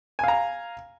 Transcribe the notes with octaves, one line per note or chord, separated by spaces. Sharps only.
F5 G#5 A#5